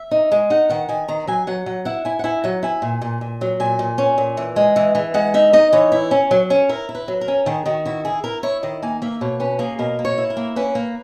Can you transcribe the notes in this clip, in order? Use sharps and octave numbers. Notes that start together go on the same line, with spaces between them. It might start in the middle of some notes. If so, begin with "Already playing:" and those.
Already playing: E5
D#4
G#3
D#4 F#5
D#3 F#5
D#3 G#5
D#3 A#5
F#3 G#5
F#3 F#5
F#3 F#5
E4 F#5
E4 G#5
F#5
E4 G#5
F#3 F#5
E4 G#5
A#2
A#2
A#2
F#3
A#2 G#5
A#2
C#4
A#2
E3
G#3
E3
E3
G#3 F#5
D#4 E5
D#4 D#5
E3 C#5
E4
C#4
F#3
C#4
E4 A#4
E4
B4
F#3
A#4
C#4
D#3 G#4
D#3 F#4
E4 F#4
E4 G#4
E4 A#4
E4 C#5
D#3 D#5
A#3 G#5
A#3 E5
B2 C#5
C#4 B4
A#3 G#4
B2 A#4
A#3
C#5
E4
A#4
A#3
C#4 B4
A#3